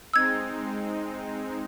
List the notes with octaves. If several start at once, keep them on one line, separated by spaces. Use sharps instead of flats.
G#3 C4 D#4 E6 G#6